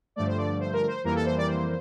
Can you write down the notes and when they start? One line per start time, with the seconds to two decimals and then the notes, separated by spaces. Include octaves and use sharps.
0.16 G2 D3 F3 A3 D5
0.26 C5
0.38 D5
0.60 C5
0.73 A#4
0.87 C5
1.04 F2 E3 G3 A#3 A#4
1.15 A4
1.25 C5
1.37 D5
1.47 C5